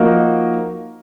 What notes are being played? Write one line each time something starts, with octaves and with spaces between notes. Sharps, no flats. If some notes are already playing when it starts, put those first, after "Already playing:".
Already playing: F3 A#3 D#4 F#4 A#4